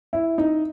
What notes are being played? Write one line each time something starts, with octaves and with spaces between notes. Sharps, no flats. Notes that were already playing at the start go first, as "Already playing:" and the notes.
E4
D#4